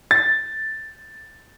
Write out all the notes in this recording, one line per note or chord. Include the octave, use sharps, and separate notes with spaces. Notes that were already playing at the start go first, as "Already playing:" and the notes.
A6